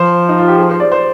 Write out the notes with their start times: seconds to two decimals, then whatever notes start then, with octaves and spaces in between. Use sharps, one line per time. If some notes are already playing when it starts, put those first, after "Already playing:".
Already playing: F3 C5
0.29 D#4
0.38 F4
0.48 G4
0.58 G#4
0.69 C5
0.80 D5
0.92 C5